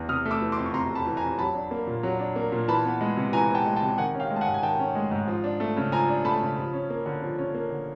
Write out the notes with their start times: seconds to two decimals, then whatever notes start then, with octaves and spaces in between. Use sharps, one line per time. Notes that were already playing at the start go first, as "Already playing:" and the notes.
Already playing: E2
0.09 C3 D#6 F6
0.25 A3
0.31 D6 E6
0.41 E3
0.52 C6 D6
0.58 F2
0.66 C#6
0.73 C3 A#5 C6
0.90 A3
0.95 A5 B5
1.06 E3
1.17 G#5 A#5
1.22 F2
1.39 F#3 A5 B5
1.55 D4
1.71 A#3
1.87 A#2
2.03 F#3
2.19 D4
2.36 A#3
2.52 A#2
2.68 E3 A5 B5
2.85 B3
3.01 G#3
3.17 C3
3.33 E3 G#5 A#5
3.49 B3
3.55 G5 A5
3.66 G#3
3.76 G5 A5
3.82 C3
3.98 D#3 F#5 G#5
4.14 C#4
4.19 F5 G5
4.30 G#3
4.36 A5
4.41 F#5 G#5
4.47 G#2
4.54 G#5
4.63 D#3 G5 A5
4.79 C#4
4.95 G#3
5.11 G#2
5.28 F3
5.44 D4
5.60 A3
5.77 C#3
5.92 F3 G#5 A#5
6.08 D4
6.25 A3 A5 B5
6.41 C#3
6.57 F3
6.74 C#4
6.90 A#3
7.06 D3
7.22 F3
7.38 C#4
7.54 A#3
7.71 D3